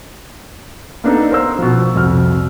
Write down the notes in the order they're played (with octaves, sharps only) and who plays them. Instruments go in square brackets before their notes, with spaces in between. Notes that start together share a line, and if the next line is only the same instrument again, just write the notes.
[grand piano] A#3 B3 D4 D#4 A4
A#4 C5 E6
B2 F3
C2 F2 F#4 F6